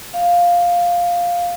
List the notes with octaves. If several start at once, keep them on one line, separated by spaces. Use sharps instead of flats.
F5